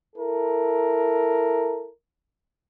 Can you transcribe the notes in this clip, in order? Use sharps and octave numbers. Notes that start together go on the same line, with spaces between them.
E4 A4 A#4